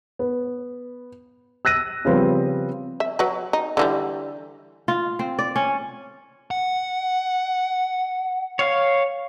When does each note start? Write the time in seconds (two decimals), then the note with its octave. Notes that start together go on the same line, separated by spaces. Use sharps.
0.19 B3
1.65 E6 F#6 A#6 D#7
2.05 C#3 F3 G3 B3 C4
3.00 E5
3.19 F#3 B4
3.53 D#4
3.77 D3 E3 G3
4.88 F4
5.19 C4
5.39 D5
5.56 C#4
6.51 F#5
8.59 C#5 F5